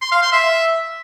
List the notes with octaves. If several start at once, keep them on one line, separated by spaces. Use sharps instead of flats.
C6
F5
C6
E5